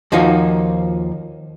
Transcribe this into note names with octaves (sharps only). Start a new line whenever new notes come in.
D#2 F3 A#3 D#4 F4 F#4